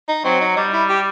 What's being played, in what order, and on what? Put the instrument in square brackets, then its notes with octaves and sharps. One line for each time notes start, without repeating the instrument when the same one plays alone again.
[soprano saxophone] D#4
[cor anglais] F#3 [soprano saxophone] C4
[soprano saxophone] D#4
[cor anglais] G3 [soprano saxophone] D#4
[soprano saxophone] E4
G4